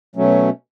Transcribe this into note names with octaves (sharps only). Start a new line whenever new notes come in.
B2 F#3 A3 C#4